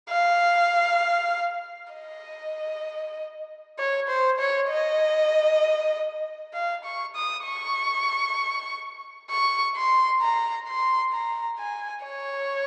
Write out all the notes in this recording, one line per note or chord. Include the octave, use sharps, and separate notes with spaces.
F5
D#5
C#5
C5
C#5
D#5
F5
C#6
D#6
C#6
C#6
C6
A#5
C6
A#5
G#5
C#5